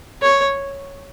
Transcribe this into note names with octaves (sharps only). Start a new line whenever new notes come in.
C#5